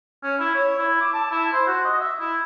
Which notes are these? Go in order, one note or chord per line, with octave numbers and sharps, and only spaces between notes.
C#4
E4
C#5
E4
D6
A5
E4
C5
F#4
D#5
E5
E4